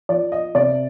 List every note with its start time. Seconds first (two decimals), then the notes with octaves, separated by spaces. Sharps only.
0.09 F3 D5
0.32 D#5
0.55 C3 D5